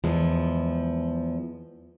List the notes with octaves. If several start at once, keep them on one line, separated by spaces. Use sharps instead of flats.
E2 F3 G#3